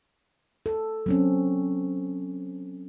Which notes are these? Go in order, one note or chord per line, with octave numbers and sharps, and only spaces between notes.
A4
F#3 C4 C#4